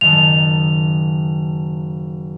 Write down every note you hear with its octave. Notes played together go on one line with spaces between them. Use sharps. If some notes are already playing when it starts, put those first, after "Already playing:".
F#1 D#3 A5 F7